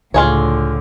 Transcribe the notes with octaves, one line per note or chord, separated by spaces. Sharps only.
C#2 A2 D3 F4 G#4 C#5